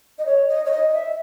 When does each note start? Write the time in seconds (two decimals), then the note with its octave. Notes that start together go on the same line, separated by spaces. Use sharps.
0.19 D#5
0.26 C#5
0.48 D#5
0.65 C#5
0.71 D#5
0.90 D#5
0.93 E5